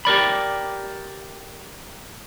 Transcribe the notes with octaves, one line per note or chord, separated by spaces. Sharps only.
G4 A#4 D5 B5